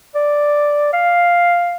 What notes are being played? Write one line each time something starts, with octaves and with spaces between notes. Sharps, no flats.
D5
F5